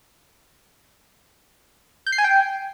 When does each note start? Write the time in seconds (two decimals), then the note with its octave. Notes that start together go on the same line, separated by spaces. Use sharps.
2.07 G6
2.12 C7
2.18 G#5
2.24 G5